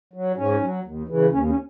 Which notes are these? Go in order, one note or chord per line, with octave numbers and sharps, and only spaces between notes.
F#3
G#2 C#4
F#3
D#2
C#3 E3
D#2 C#4
C#4